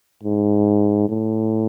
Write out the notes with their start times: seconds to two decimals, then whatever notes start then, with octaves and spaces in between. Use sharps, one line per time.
0.23 G#2
1.09 A2